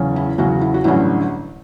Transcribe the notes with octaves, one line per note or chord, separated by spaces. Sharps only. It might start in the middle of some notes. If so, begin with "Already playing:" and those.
Already playing: E2 C#3 F#3 C#4
E4
E2 C#3 F#3 C#4 F#4
E4
F#4
A1 G2 D3 F#3 C#4 E4